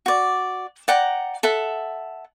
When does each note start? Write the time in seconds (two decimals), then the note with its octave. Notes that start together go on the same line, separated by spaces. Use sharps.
0.06 F#4 D5
0.88 D5 F#5 G5 A#5
1.43 A4 E5 F#5